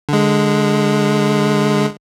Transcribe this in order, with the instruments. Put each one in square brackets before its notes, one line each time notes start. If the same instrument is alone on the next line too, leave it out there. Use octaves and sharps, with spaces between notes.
[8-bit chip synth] D3 G#3